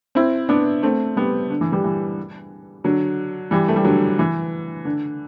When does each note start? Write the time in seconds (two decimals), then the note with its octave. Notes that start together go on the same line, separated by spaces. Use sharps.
0.15 C4 E4
0.49 B3 D4
0.83 A3 C4
1.16 G3 B3
1.50 D3
1.61 E3
1.72 E3 G3
1.84 E3
2.84 D3 F#3
3.51 E3 G3
3.68 A3
3.76 G3
3.84 D3 F#3
4.19 E3
4.85 D3